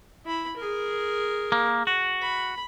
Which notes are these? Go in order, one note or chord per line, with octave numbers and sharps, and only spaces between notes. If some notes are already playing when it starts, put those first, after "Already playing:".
E4 B5
G#4 A#4
A#3
F#4
B5